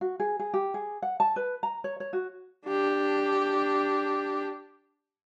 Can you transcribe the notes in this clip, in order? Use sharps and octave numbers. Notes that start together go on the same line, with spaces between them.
F#4
G#4
G#4
G4
G#4
F#5
A5
B4
A#5
C#5
C#5
F#4
D4 G4